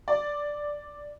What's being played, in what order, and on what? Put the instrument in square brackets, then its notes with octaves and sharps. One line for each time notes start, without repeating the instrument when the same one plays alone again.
[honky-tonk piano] D5